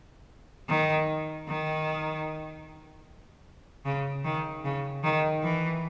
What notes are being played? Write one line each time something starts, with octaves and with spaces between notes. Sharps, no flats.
D#3
D#3
C#3
D#3
C#3
D#3
E3